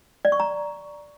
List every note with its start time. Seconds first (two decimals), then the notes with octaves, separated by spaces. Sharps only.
0.25 D5
0.32 C#6
0.40 A#5